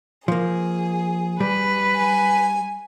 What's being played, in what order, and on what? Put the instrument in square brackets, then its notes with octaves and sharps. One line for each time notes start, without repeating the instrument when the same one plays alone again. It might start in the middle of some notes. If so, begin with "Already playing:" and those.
[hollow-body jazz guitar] F3 A#3 [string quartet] G#4
[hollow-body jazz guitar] G3 [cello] B4
[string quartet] G#5